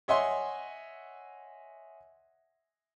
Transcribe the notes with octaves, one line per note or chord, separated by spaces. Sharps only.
C#5 D#5 E5 F#5 G#5 C6